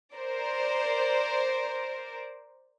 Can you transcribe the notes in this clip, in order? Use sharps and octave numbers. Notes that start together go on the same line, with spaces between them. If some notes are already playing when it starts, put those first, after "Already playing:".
A#4 C5 D5